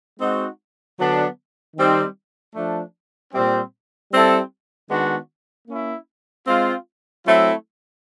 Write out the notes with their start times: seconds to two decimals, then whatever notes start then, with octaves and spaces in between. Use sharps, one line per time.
0.19 G#3 C4 D#4 F#4
0.98 D3 F#3 B3 D4
1.75 D#3 G3 C4 D#4
2.55 F3 A3 D4
3.32 A#2 G3 C4
4.12 G3 C4 E4 A4
4.89 D#3 G#3 B3 D4 F#4
5.67 A#3 C#4 E4
6.46 G#3 C4 F4
7.25 F#3 A3 C4 E4